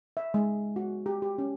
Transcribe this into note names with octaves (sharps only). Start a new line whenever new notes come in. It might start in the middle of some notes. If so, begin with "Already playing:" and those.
E5
G#3
F#4
G4
G4
C#4